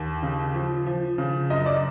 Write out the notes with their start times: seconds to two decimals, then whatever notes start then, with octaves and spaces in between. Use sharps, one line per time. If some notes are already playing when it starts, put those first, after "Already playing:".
Already playing: D#2
0.23 C#3
0.54 F3
0.86 F3
1.18 C#3
1.50 F#2 D#5
1.66 D5